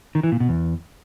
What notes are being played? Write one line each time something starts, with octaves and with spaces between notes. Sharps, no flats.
D#3
E3
A#2
B2
E2